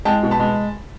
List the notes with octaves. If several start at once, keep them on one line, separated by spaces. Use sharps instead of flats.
G#3 G5 A5
B2
A5 B5
G#3